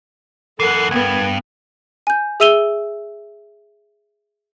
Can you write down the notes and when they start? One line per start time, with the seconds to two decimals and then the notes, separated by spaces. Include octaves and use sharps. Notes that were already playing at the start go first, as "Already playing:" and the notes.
0.60 F#2 E3 A4 A#4 F#5 C7
0.91 C#2 G2 B3 G#6
2.07 G#5 G6
2.40 G#4 E5 E6 D#7 F7 G7